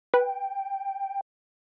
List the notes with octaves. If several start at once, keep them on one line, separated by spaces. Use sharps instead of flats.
B4 G5